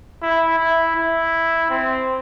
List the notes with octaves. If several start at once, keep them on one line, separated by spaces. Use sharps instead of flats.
E4
E4
E4
C4